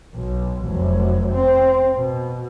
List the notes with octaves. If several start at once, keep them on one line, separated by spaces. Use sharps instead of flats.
B1
F1 F#3
C4
B2